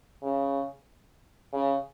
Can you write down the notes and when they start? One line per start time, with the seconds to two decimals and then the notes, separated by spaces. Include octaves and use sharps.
0.23 C#3
1.53 C#3